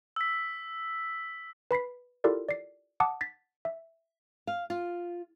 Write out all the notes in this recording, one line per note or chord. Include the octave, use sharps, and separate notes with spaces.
E6 B6
B4 B5 B6 C7
E4 F4 G4 A4 A#4 D5
D5 C7
F#5 A5 D6 D#6
A6 B6
E5
F5
F4